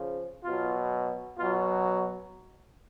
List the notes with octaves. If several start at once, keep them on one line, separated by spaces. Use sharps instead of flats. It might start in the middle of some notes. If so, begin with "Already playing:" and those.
Already playing: C#3 F3
B2 F4
F#3
B2 F#3 F4